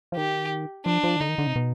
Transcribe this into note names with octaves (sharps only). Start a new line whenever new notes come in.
F3
D#3 G4
F3 D4
F3
D#3
D3 D#4
D#3
D3
C3
B2